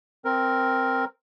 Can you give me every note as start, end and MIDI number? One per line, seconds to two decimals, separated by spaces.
0.25 1.05 60
0.25 1.05 70